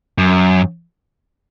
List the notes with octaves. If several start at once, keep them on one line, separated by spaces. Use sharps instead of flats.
F#2